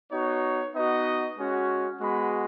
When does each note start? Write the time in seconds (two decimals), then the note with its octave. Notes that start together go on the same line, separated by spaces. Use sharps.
0.11 B3 D#4 F#4 C#5
0.74 B3 D#4 F#4 D#5
1.38 G#3 C#4 F#4
2.00 G#3 B3 F#4 B5